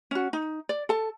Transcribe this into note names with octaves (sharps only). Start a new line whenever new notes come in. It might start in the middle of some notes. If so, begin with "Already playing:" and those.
C#4 F#4
D#4
D5
A4 A5